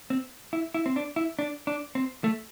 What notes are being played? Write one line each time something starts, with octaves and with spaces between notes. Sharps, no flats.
C4
E4
E4
C4
D4
E4
D4
D4
C4
A3